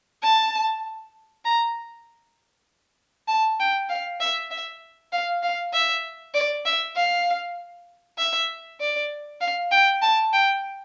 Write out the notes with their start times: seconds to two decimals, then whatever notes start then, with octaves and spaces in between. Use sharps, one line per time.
0.23 A5
1.45 A#5
3.28 A5
3.60 G5
3.89 F5
4.20 E5
4.51 E5
5.12 F5
5.43 F5
5.73 E5
6.34 D5
6.66 E5
6.97 F5
8.18 E5
8.80 D5
9.41 F5
9.71 G5
10.02 A5
10.33 G5